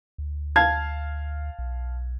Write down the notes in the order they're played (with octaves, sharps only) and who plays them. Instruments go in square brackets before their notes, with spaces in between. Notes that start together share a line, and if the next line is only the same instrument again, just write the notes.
[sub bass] D2
[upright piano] F5 A5 G#6
[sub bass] B1